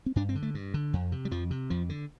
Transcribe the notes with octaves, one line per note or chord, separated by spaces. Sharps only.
C4
G2 D4
C4
D3
A3
G2
D3
F2
C3
G3
F2 F3
C3
F2 F3
D3